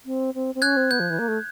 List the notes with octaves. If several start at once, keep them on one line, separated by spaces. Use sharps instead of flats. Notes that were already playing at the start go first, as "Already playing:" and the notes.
C4
C4
C4
C#4 F#6 G#6
C4
B3 G6
F3
E3
A#3
A3